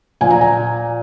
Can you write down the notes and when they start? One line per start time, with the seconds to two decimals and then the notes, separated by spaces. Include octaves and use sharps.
0.21 A#2 F3 G#5
0.30 A#5
0.41 G#5